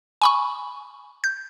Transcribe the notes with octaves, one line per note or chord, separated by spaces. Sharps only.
G#5 B5 C#6
G6